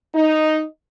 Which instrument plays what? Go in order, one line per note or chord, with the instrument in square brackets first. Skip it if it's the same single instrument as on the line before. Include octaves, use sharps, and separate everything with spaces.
[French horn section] D#4